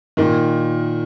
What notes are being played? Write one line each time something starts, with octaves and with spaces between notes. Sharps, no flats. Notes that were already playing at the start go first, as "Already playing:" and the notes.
A#2 D#3